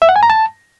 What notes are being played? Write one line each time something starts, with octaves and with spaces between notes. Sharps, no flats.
E5
F#5
G#5
A#5
A5